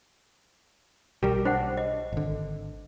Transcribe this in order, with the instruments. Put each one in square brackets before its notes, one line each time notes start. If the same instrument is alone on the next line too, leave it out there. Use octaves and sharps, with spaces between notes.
[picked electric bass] B1 G3 [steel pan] G4 A#4
[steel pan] D4 [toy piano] C5 F#5
[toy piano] D#5
[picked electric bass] G#1 D3